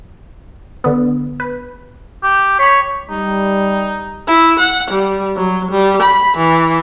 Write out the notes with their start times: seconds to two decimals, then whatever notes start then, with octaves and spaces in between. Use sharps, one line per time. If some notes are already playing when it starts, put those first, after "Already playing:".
0.84 D3 B3
1.40 B4
2.23 G4
2.59 C#5 B5 B6
3.10 G3 D#4
4.27 E4
4.59 F#5
4.91 G3
5.36 F#3
5.71 G3
6.02 B5
6.37 E3